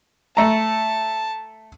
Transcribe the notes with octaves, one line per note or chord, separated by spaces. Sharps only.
A3 A5 A#5